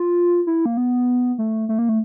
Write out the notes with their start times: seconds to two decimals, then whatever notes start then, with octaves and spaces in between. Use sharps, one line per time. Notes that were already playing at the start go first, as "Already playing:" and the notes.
Already playing: F4
0.47 E4
0.66 A#3
0.77 B3
1.38 A3
1.69 A3
1.79 A#3
1.89 A3